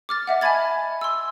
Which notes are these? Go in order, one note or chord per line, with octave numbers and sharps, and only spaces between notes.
D6 F6 A6
D#5 E5 F#5
E5 G#5 A5 B5 G#6 A6
C6 E6